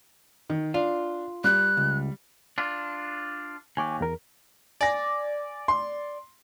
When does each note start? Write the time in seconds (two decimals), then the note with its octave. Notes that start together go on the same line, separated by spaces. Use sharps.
0.50 D#3
0.74 D4 F4
1.44 G3 F#6
1.77 C#2
2.58 D4 F4
3.77 D#2 G#5 C#6 D6
4.01 E2 A#4
4.81 D5 G#5 A#6
5.68 C6